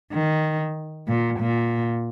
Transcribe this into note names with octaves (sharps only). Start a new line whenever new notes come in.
D#3
A#2
A#2